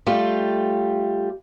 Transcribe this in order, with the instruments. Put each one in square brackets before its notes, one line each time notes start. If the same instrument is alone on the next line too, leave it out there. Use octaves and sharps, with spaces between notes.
[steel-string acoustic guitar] G3 A3 F4 G4